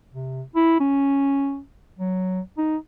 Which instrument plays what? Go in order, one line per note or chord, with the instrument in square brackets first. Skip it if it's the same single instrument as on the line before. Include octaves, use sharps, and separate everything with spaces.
[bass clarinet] C3
E4
C#4
F#3
D#4